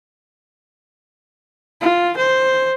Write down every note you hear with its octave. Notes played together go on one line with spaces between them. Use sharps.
F4
C5